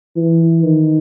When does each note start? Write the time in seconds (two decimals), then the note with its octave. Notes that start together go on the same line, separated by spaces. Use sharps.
0.16 E3
0.63 D#3